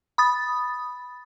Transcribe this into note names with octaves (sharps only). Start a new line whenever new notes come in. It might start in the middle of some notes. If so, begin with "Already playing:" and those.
B5 D#6 A6